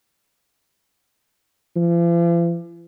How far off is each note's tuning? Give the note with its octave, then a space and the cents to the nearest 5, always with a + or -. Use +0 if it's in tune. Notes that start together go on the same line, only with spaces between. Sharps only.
F3 -45